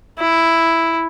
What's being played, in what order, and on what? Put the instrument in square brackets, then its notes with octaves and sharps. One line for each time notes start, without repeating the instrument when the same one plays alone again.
[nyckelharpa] E4